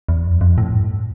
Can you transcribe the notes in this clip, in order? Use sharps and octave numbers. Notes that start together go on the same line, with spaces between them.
E2
F2
F2
A2
G2